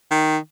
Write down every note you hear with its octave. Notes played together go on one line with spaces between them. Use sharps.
D#3